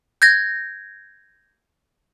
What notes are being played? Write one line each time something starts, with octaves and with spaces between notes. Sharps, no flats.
G6 G#6 A#6